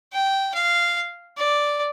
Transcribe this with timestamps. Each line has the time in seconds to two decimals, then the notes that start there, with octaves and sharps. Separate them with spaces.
0.13 G5
0.55 F5
1.38 D5